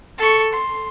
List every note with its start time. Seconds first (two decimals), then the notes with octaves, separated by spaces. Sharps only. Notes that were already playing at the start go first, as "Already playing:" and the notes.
0.18 A4 C#6
0.53 C6